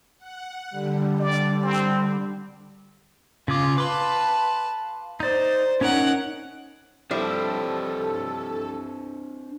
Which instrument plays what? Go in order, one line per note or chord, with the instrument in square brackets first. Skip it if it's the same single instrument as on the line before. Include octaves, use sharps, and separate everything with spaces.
[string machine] F#5
D3 G3
[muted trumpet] D5
C4
[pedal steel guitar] C#3 G#4 D6 [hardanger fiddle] F4
[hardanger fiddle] B4 A5 [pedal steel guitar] F5 C6 D6
[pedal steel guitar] D#4 D5 [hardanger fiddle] C5
[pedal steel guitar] C#4 D#4 C#5 [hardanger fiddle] A#4 F#5
[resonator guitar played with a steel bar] F3 G3 E4 [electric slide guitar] C4 D4 C5 [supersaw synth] A4